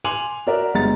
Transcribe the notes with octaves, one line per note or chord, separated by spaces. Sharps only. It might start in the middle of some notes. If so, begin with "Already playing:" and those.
G#5 C6 D6 F7 F#7
F#4 A#4 D5 E5
G1 G#3 A#5 A6